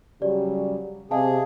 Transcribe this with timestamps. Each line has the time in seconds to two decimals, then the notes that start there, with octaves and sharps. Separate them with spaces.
0.22 C#3 F#3 G3 G4 D5
1.11 C3 G#4 D#5 F5 A5